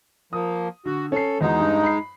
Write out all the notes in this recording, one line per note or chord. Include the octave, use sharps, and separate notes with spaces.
F3 A#3 D#6
D3 F#4
C#4 A4 C7
E2 G#3 D#4 F#4
G2
B5 C7